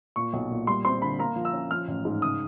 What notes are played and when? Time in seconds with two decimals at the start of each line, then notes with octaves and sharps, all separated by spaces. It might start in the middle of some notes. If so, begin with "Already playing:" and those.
0.16 A#2 C#6
0.33 B1
0.50 A#2
0.67 G3 C6
0.85 C4 C6
1.02 D3 B5
1.19 A#3 A#5
1.36 F3
1.45 E6
1.53 C#4
1.71 F3 F6
1.88 A1
2.05 G#2
2.22 C#3 D#6